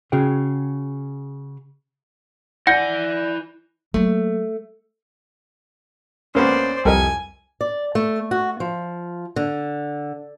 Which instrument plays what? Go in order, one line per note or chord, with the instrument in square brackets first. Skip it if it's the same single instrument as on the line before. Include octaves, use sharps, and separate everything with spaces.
[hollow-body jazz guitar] C#3 F#4 G#4 G5
[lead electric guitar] E4 G#5 [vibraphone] D5 [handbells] F#5 [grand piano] G6 A#6
[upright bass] F#3 A#3 [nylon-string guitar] A3
[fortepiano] D2 A#3 B3 [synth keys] C#4 [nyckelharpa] C5 D5
[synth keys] C2 F2 G3 [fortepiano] A4 A#4 D#5 [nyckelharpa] G#5
[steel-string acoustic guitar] D5
A3
F#4
F3
D3